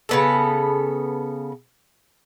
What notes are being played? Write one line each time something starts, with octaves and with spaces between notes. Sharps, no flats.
C#3 B3 A4